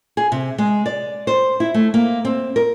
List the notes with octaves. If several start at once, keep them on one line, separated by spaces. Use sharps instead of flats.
G#4
C3
G#3
D5
C5
E4
A3
A#3
C4
A#4